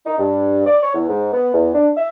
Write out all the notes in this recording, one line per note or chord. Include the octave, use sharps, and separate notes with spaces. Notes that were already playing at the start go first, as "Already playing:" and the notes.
D#4
G2
D5
C#5
E2
G#2
B3
E2
D4
E5